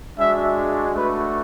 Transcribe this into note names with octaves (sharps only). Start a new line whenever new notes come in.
G#3 D4 F#4 E5
A3 D4 F#4 B4